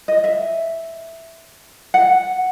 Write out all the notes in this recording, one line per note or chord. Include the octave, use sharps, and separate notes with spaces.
D#5
E5
F#5